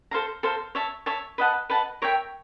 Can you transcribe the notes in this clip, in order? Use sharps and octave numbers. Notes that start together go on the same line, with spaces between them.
A4 C5 F5 A#5
A4 C5 F5 A#5
C#5 E5 A5
C#5 E5 A5
B4 D#5 F#5 A5
B4 D#5 F#5 A5
A#4 C#5 E5 G5